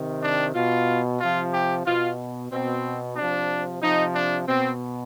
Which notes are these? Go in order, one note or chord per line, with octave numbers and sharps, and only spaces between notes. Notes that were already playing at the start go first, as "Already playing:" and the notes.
Already playing: C3 D#3
D4
B2 F4
C3 F3 F4
G4
B2 F4
B2 C4
C3 F3 D4
C3 F3 D#4
D4
B2 C4